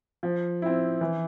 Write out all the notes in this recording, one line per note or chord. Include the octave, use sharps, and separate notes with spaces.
F3
C4 E4
E3